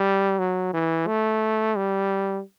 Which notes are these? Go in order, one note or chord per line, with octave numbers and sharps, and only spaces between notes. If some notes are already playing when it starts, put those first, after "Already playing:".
Already playing: G3
F#3
E3
A3
G3